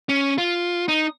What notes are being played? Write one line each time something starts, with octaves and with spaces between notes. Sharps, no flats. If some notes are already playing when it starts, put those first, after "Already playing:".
C#4
F4
D#4